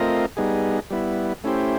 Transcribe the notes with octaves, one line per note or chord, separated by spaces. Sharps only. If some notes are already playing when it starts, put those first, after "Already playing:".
Already playing: A3 C4 F4 A#4 D#5
G3 B3 D#4 G#4
G3 B3 E4
A3 C#4 E4 G4 C5